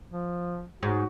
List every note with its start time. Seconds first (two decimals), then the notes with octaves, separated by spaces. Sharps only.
0.10 F3
0.83 G#2 F#4